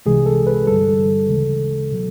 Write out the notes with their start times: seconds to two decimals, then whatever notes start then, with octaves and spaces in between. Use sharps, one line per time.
0.06 C2 C3 E3 G#3 G#4
0.26 A4
0.47 B4
0.67 G2 D3 G3 A4
1.29 D2 C#3 E3 G#3
1.92 B2 F#3